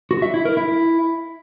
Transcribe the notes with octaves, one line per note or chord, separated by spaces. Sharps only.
F#4
E5
E4
A#4
E4